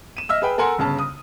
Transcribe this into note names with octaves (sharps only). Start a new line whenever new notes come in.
D#7 E7
D#5 E5 E6 F6
G#4 B4 G5
A4 A#4 F#5 G#5 C6
G1 C#3 A5
D#6